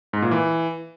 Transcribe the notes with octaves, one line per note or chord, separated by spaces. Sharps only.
G#2
A#2
E3